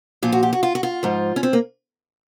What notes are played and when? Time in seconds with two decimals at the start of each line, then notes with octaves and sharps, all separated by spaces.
0.23 A#2 F3 F4
0.32 F#4
0.43 G4
0.53 F#4
0.63 F4
0.75 F#4
0.83 F4
1.03 G#2 F3
1.36 C#4
1.43 C4
1.53 A#3